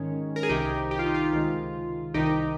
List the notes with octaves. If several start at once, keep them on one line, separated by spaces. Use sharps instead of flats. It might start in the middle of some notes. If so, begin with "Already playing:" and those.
Already playing: G#2 D#3 G#3 C#4
A#4
G#4
C2 C3 D#3 D#4 G4
G4
F4
D#4
F4
C#2 C3 D#3 G#3
C2 C3 D#3 D#4 G4